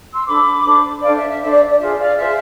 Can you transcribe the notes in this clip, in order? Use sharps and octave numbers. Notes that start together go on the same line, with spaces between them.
C6 E6
D4 A4 C5 B5 D6
D4 A4 C5
D4 A4 C5 D5 F5
E5
E5
D4 A4 C5 E5
D5
D5
F4 G#4 C5 E5
D5 F5
F4 G#4 C5 E5